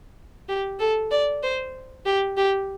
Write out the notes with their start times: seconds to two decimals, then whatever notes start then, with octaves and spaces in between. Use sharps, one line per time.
0.49 G4
0.80 A4
1.11 D5
1.43 C5
2.06 G4
2.37 G4